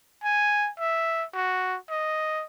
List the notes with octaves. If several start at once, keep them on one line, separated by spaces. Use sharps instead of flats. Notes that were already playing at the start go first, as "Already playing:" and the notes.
G#5
E5
F#4
D#5